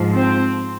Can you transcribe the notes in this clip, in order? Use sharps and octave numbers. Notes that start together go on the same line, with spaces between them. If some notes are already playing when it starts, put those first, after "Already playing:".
Already playing: G#2 F3
C4